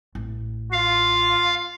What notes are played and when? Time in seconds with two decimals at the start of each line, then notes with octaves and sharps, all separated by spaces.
0.15 A1
0.72 F4 F5